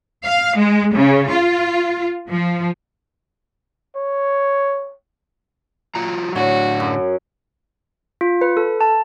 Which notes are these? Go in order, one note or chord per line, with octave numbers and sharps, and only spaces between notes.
F5
G#3
C#3
F4
F3
C#5
F#3 F4 A#5
A2 D3 D4 F#4 C#5
F#2
F4
B4
A4
A5